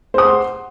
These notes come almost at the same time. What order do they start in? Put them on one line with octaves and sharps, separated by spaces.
C5 D#6 F#5 C6